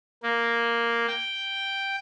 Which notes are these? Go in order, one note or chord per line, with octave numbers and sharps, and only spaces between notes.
A#3
G5